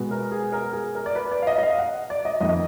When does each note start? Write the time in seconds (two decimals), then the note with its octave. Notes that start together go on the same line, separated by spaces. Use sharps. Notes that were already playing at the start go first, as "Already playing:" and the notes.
Already playing: B2 G#3 B3
0.11 A#4
0.32 G#4
0.52 A#4
0.73 G#4
0.95 A#4
1.06 D5
1.15 B4
1.31 D5
1.42 F5
1.47 D#5
1.58 D#5
1.63 F5
1.79 F#5
2.10 D5
2.25 D#5
2.41 F2 D#3 A#3 D#5